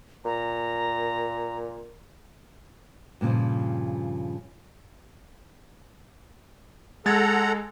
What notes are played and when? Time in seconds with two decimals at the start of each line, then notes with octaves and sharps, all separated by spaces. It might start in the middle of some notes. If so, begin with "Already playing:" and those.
0.25 A#2 A#5
3.21 G2 A#2 C#3 F3
7.06 G#3 A4 F#5 A#5 G#6 A6